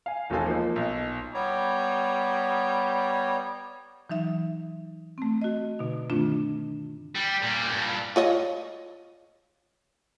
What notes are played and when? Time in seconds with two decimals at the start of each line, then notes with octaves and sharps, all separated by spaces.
0.06 F5 G#5
0.30 E1 D#3 G#3 A4 G#5
0.46 F3 A#3 D#4
0.76 B1
1.34 G3 B3 C#5 A#5
4.10 E3 F#3 D#4 E5
5.18 A3 C4
5.42 F#4 D#5
5.79 B2 D3 D#4
6.10 G2 D#3 A3 C4 D4 F4
7.15 G3
7.43 A#2 G3
7.72 G2 A#2
8.16 F4 C#5 D#5